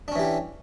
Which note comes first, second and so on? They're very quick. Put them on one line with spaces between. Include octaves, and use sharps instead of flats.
D4 C#4 E3 G4